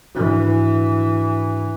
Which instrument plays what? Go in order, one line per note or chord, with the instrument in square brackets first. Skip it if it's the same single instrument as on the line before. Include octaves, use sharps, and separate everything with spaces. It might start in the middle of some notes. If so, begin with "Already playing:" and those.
[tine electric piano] G#2 D4 F#4 [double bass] E3